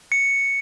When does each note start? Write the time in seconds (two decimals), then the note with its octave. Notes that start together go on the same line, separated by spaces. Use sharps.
0.12 C#7